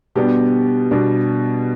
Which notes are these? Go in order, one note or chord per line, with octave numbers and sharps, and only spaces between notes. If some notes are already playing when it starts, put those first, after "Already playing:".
B2 G3 B3 D4 G4
B2 G3 B3 D4